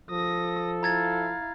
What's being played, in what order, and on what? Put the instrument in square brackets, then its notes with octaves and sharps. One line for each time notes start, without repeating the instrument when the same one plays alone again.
[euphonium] F3 [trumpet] A4 [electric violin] D#6 A#6
[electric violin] E4 F5 [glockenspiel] A#5 G#6 A6